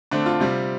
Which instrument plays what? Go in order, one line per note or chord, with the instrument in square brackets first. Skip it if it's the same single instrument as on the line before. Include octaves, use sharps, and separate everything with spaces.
[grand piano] D3 A3 C4 D4
F4
C3 G3 C4